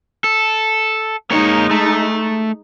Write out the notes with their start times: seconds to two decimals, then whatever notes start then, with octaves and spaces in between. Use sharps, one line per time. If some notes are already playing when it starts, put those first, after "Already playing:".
0.24 A4
1.31 G#3 A#3 D#4 C#5
1.71 A3